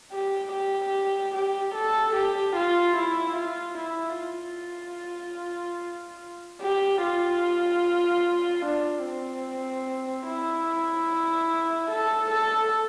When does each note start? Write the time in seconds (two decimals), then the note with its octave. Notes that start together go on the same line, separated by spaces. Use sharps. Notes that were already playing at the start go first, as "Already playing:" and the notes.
0.12 G4
0.53 G4
1.35 G4
1.75 A4
2.16 G4
2.56 F4
2.97 E4
3.37 F4
3.78 E4
4.19 F4
6.62 G4
7.03 F4
8.66 D4
9.06 C4
10.28 E4
11.91 A4
12.31 A4